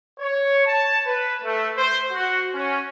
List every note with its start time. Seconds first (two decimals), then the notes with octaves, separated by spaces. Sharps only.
0.19 C#5
0.66 A5
1.05 B4
1.43 A3
1.77 C5
2.11 F#4
2.54 C#4